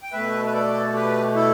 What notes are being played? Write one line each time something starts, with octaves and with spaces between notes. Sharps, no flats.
G5
B2 A3 B4 E5
B4
A4 D5
G4 B4
E4 A4